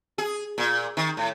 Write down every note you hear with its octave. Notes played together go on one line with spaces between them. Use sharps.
G#4
A#2
D#3
A2